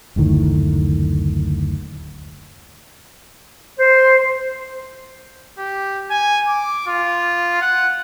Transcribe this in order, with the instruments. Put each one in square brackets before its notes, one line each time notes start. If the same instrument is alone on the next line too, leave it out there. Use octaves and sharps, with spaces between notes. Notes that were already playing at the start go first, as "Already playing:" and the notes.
[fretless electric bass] F#1 D2 A2 D#3
[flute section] C5
[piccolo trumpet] G4
G#5
D6
F4
F#5